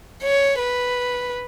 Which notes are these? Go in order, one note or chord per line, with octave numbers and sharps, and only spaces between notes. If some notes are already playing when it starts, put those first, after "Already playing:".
C#5
B4